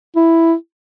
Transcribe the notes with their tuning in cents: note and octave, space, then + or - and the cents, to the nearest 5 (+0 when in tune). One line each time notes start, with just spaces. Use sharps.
E4 +5